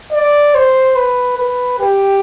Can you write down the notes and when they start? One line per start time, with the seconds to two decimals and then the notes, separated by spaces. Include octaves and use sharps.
0.13 D5
0.55 C5
0.96 B4
1.38 B4
1.79 G4